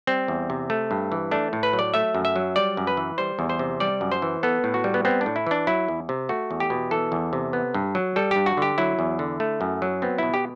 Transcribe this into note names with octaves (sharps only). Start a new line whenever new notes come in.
G3 C4
E2
C3
A3
G2
E3
A3 D4
A2
B4
F#3
D5
A3 E5
F#2
E5
F#3
G3 D5
F#2
B4
E3
G3 C5
E2
C5
C3
G3 D5
F#2
C5
E3
B3 A4
A2
F#4
G3
B3
B3 C4
D4
A2
E4
E3 D4
F#3 E4
E2
C3
A3 F#4
E2
G4
B2
E3 A4
E2
C3
B3
G2
F#3
G3 A4
G2 G4
F#4
D3 G4
F#3 E4
E2
D3
A3
F#2
F#3
B3 C4
B2 E4
G4